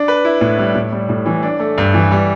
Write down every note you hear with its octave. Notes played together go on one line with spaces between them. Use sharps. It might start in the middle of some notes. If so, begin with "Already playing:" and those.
Already playing: D4
B4
E4
A2
G3
A2
G3
A2
E3
D4
A3
G2
E3
G3